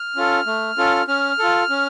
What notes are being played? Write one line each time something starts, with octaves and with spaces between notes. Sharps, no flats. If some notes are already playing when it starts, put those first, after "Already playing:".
Already playing: F6
C#4 F4 A4
A3
C#4 F4 A4
C#4 F6
F4 A4
C#4